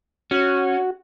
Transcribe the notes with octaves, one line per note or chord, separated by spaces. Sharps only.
C#4 F#4